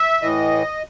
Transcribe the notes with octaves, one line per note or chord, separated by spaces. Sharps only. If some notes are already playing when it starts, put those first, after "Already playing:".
Already playing: E5
A2 E3 D#5